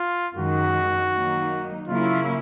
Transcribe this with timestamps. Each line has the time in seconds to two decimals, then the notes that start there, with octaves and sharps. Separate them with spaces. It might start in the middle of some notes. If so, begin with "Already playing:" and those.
Already playing: F4
0.37 F#2 D#3 G#3 F#4
1.13 D#3 F#3 A#3 D#4
1.88 C#3 F#3 A#3 C#4 E4 F4